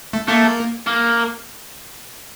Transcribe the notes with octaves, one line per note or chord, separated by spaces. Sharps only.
A3
A3 A#3
A#3